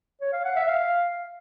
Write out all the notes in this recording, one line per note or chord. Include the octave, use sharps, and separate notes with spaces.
C#5
F5
F#5
E5
F5